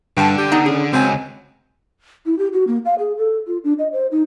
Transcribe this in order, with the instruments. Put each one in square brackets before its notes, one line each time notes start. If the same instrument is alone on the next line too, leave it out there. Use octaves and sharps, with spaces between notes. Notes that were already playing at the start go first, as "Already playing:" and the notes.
[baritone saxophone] G2 [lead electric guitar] D3 [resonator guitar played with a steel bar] G5 A5
[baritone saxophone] G4
[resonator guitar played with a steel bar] B3 D#4
[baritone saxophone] C#3 [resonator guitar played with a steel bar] G#4
[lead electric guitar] C#2 [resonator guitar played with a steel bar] F#3 G#5 [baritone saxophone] C4
[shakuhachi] E4
G4
F#4
A#3
F5
G#4
A4
F4
D4
D#5
C5
D#4